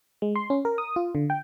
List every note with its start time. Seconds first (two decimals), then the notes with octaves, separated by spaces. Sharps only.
0.22 G#3
0.36 C6
0.50 C#4
0.65 A#4
0.78 D#6
0.96 F4
1.15 D3
1.30 G5